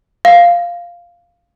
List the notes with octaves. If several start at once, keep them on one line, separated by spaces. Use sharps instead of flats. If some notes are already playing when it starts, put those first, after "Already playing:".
F5